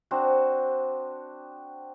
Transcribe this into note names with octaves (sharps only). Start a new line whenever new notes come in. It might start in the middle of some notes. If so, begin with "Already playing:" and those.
C4 D4 F#4